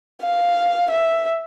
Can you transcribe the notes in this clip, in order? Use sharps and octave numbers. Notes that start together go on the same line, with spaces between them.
F5
E5